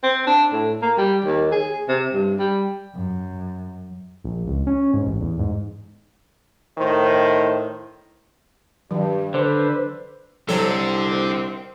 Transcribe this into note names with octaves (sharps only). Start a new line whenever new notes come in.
C4
D4
A2
A#3
G3
D#2
G#4
C3
G2
G3
F#2
A#1
C#2
C#4
G#2
A1
E2
G#2
A2 D#3 C5
G2 D#3 F#3
D3 B4 C5
C2 D3 D#3 F#3 C4 A4